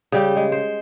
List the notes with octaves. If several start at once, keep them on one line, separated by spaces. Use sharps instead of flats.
C#3 G3 G4
G#3
C5